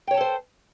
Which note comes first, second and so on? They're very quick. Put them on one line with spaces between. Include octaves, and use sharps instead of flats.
G5 C#5 A5 A4 C5